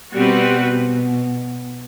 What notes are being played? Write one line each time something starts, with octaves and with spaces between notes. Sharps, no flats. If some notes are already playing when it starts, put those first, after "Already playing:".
B2 G3 C4 F#4 B4